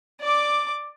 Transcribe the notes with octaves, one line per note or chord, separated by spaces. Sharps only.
D5 D6